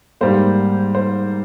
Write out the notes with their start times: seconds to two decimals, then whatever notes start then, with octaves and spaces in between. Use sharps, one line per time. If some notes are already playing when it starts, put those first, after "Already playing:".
0.21 G#2 G3 A#3 C5
0.95 C5